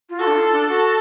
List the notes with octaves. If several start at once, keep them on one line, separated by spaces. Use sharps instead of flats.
F4
F#4 A4
D4
F4
D4
F#4 A4